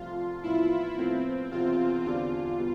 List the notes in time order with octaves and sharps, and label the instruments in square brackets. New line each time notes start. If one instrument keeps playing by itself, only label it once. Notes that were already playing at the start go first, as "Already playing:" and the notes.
Already playing: [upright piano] C2 C3 F3 A3 [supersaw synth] F4
[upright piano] A1 A2 F3 B3 [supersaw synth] E4
[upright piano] A2 F3 B3 F4 A4 [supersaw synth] C4
[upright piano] E1 E2 C3 E3 [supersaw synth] F4
[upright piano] E2 D3 G3 D4 [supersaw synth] F4
[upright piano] B2 G3 B3 F4